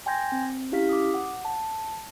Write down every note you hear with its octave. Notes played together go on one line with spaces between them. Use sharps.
G5 G#5 C6 G6 G#6 A#6
C4
C#4 E4 G4 F5 F6 B6
D6 D#6
F#5
A5